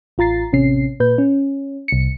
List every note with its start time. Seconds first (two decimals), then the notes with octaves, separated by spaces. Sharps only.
0.18 A1 F4 A#5 A6 C7
0.53 A1 C3 C#4 C7
1.00 A#2 B4 G6
1.18 C#4
1.88 C2 C#7